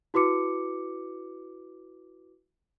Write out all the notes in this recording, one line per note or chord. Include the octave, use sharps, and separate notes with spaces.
E4 F#4 B4 D6 C#7